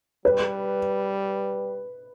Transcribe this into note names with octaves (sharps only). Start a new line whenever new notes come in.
G3 B4